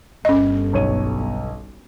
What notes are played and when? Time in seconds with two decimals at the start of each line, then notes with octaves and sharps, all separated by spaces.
0.25 G1 C#4 D#5
0.73 B1 C#5 D#7